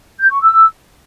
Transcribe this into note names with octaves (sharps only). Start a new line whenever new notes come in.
G6
C#6
E6